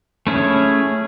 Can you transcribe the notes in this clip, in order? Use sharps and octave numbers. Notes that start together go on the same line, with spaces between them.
A3 C#4 E4 G#4 C#5